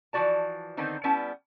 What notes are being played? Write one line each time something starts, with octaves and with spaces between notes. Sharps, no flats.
E3 F3 F#4 D5 A5
D3 D#3 B3 C4 D#4
G3 B3 C#4 E4 A5